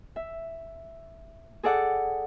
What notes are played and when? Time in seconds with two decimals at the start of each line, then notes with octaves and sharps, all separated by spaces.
0.16 E5
1.63 G#4 A4 D5 F#5